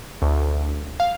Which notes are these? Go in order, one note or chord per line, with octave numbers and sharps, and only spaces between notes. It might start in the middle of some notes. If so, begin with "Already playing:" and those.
D2
F5